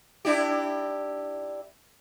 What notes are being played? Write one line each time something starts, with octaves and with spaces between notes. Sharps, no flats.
D4 E4 G4